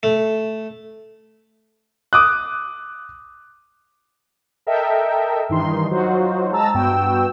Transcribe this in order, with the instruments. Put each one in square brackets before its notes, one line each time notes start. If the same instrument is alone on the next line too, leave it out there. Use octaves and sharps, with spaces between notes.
[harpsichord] A3
[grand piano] D6 D#6 F#6
[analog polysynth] A4 A#4 D#5 E5 G5
G2 D#3 E3 D#4 C6
F#3 D#4 F4 F#4 C5
G#3 A5 A#5 E6 A6
G2 B3 F#4 G5 E6